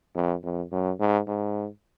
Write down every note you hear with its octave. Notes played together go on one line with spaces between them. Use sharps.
F2
F2
F#2
G#2
G#2